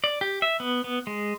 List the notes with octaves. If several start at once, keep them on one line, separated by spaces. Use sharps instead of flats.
D5
G4
E5
B3
B3
G#3